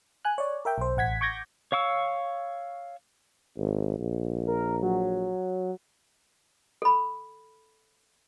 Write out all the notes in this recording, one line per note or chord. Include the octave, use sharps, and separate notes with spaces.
G#5 F#6
C#5 D5
A#4 E5 G5
B1 C5
A1 F#5 G#6 B6
C#6 D6 G6 G#6 A#6
C#5 F5 C#6 E6
G#1
A#1
A#4
F#3
A4 B5